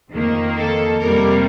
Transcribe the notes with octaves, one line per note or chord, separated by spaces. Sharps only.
F2 D#3 A#3
A4
F2 C3 G3 A#3 A#4